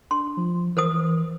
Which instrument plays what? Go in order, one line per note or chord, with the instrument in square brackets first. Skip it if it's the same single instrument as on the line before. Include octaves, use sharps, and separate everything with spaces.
[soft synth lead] D4 [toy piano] C6
[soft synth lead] F3
[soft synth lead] E3 [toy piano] A#4 C5 D#6